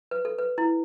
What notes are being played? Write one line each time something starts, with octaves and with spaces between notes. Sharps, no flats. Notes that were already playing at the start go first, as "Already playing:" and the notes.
B4
A4
B4
E4